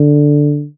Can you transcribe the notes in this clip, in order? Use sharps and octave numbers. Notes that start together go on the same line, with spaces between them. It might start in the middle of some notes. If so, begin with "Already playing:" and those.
Already playing: D3